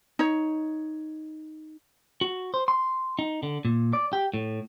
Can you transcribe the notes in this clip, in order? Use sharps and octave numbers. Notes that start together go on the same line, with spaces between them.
D#4 C#5
F#4
C5
C6
D#4
D3
A#2
D5
G4
A2